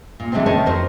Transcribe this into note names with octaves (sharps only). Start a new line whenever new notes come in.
A#2
D3 E3 F#3 G#3 A3 C4
E2 C3 D#3 A3 C#5 A5
F2 F#4 A#4 C5